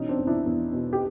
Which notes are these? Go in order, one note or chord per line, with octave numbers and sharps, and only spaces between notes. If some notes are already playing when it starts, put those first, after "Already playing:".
Already playing: B2 E3 C#4 D#4
C4 D4
E2
D4 E4
E2
B2
G4